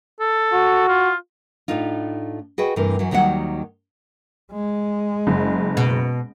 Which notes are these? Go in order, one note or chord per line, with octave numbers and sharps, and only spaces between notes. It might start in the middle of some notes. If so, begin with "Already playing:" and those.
A4
F#4
F4
A2 A3 D4 D#4 F4
F#4 G#4 B4 D#5 G5
G2 C3 E3 A3 A#4
F#2 E3 F#3
D#2 D#3 F#3 G3 F#5
G#3
F#1
B2